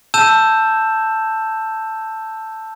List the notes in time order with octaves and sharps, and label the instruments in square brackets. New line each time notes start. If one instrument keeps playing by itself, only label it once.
[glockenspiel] A5 E6 G6 E7